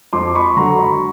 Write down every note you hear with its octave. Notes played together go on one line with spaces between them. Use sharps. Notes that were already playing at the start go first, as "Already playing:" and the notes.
F2 C6 D6
B5 C#6
D3 F#3 A#5 C6
B5 C#6